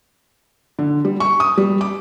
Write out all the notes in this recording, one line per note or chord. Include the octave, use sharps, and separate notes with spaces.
D3
G3
C#6
D#6
G3
D6